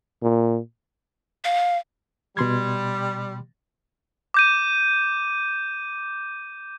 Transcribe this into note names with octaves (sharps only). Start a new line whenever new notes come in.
A#2
F5
B2 G3 C6 G#6
D6 G6 D#7